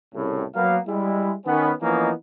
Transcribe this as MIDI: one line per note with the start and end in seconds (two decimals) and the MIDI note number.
0.15 0.44 36
0.15 0.44 45
0.15 0.44 49
0.55 0.78 54
0.55 0.78 58
0.55 0.78 59
0.55 0.78 77
0.88 1.34 55
0.88 1.34 56
0.88 1.34 64
1.46 1.73 51
1.46 1.73 59
1.46 1.73 61
1.82 2.12 52
1.82 2.12 53
1.82 2.12 58
1.82 2.12 59
1.82 2.12 61
1.82 2.12 63